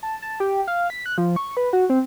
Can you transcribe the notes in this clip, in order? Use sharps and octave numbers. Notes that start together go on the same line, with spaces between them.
A5
A5
G4
F5
B6
F#6
F3
C#6
B4
F#4
C4